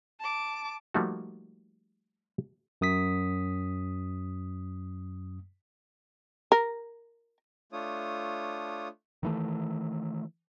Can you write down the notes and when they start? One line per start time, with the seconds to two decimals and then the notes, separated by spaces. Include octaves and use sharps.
0.21 A5 D6
0.94 F3 G3 A3 A#3 D#4 F#4
2.81 F#2 D#6 B6
6.52 A#4
7.72 A3 D4 F4 C#5 D#6
9.23 D#3 E3 A3